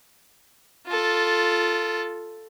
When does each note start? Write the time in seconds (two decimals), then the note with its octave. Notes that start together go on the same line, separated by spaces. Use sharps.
0.87 F4 A4